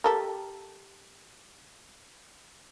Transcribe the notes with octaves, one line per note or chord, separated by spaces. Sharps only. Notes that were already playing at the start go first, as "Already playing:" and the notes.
G4 A4 A#4